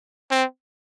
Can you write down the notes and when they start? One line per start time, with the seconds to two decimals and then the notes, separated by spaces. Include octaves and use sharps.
0.31 C4